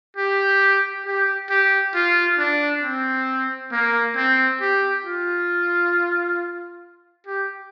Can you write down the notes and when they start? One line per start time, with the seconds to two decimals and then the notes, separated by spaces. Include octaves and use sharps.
0.17 G4
1.06 G4
1.50 G4
1.94 F4
2.38 D4
2.83 C4
3.72 A#3
4.16 C4
4.61 G4
5.04 F4
7.27 G4